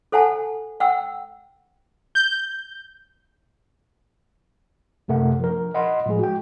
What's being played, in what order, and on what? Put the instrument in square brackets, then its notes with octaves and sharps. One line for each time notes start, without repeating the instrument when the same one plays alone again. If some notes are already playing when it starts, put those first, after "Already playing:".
[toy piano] A4 C5 F#5 G#5 A5
F#5 G5 E6
[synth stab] G6
[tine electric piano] F#2 C3 A3 A#4 F#5
F3 A#4
D#5 F#5 B5 C6
A2 F3 G#3 G#4
F#4 G5